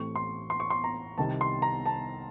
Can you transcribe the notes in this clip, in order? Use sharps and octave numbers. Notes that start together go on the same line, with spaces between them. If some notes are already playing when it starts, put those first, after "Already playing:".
Already playing: A1 A2 A3 C4 C#6
C6
C6
C#6
C6
A#5
C2 C3 D#3 A5
C6
A#5
A5